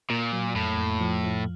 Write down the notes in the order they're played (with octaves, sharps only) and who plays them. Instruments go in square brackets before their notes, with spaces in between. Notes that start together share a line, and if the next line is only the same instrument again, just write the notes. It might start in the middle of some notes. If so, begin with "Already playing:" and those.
[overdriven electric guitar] A#2 [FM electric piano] A#3
[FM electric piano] F#3
[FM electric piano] F2 [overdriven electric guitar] A2
[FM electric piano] F2
F3
F3